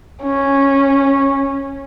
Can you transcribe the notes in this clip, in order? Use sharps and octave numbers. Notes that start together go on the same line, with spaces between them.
C#4